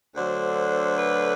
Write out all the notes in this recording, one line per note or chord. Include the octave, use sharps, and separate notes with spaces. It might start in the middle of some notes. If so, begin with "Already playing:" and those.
D2 D3 F#3 C5
B4